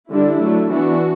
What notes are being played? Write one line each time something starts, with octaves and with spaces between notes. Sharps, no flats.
D3 G3 D4 E4
F#3 A3 D4
E3 B3 D4 F#4